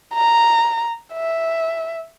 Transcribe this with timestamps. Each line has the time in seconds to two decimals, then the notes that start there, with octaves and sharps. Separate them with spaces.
0.14 A#5
1.13 E5